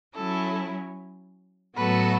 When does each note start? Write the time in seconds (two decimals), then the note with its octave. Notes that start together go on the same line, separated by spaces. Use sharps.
0.15 F#3 C#4 E4 A4
1.76 A2 F#3 B3 F#4 A4 B4